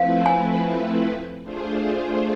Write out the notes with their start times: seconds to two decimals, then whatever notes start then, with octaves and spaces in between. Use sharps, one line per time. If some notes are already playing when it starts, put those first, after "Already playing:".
Already playing: F3 A3 C4 E4 B4 F5
0.26 G#5
1.43 A3 D4 F4 G#4 C5